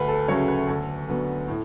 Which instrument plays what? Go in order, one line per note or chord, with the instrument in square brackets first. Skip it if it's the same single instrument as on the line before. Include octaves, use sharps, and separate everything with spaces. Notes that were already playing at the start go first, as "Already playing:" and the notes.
Already playing: [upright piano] D2 B4
A4
C#3 F#3 A3 C#4 C#5
B4
D2 A4
D3 F#3 B3
A2